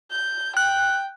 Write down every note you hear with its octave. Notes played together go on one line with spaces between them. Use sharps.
G6
G5 F#6